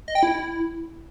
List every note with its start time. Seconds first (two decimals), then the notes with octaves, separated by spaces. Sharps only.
0.08 D#5
0.15 G5
0.23 E4